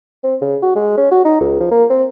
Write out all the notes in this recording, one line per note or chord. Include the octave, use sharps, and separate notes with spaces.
C4
C#3
F#4
G#3
C#4
F#4
D#4
C#2
F3
A#3
C4